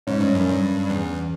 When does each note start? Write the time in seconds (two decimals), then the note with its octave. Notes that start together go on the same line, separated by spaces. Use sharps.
0.07 G#2 C#4
0.21 G2
0.35 F#2
0.48 G2
0.90 E2